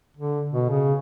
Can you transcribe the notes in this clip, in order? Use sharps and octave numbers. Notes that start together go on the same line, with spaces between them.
D3
B2
C#3